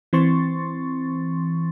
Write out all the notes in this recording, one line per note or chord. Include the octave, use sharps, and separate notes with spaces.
E3 C4 C6 C#6 A6